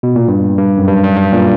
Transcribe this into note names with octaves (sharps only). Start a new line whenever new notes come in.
B2
A#2
G2
G2
F#2
G2
G2
G2
A#2